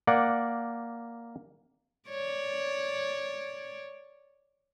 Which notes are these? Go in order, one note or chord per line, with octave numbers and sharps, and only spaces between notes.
A#3 D5 F#5
C#5 D5